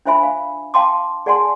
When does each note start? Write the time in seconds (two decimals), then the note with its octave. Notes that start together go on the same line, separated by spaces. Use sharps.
0.05 D4 F4 C5 E5 G#5 B5
0.23 F5
0.74 F5 G5 A5 C6 D6
1.26 G#4 D5 F#5 G#5 A5 C6